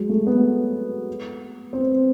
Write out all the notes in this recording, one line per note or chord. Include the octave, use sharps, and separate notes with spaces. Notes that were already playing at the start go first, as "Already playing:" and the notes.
Already playing: F#3 G#3
A3
B3
C4